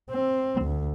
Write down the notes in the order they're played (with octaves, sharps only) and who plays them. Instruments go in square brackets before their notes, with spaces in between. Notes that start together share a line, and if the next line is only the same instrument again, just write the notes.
[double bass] C4
D2